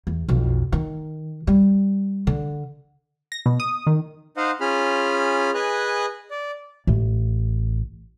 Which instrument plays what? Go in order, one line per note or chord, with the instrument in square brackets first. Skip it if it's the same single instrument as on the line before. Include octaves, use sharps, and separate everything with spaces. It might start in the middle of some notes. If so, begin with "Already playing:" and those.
[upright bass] E2
B1 F2
D#3
G3
D3
[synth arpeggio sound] A#6
B2
D#6
D#3
[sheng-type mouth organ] D#4 C5 D#5 F5 F#5
C#4 F4 G#4 B5 F6
G#4 B4 D#5 G#5 F#6
D5
[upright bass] A1